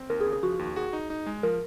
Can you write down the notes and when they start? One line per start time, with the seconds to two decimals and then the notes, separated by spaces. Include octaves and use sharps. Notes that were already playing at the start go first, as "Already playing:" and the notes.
Already playing: C4
0.10 D#2 A#4
0.20 G#4
0.26 C#3
0.32 G#4
0.43 F3 F#4
0.54 F#4
0.59 D#2
0.66 F#4
0.76 F#4 G#4
0.93 D#4
1.10 D#4
1.27 G#3
1.43 F3 A#4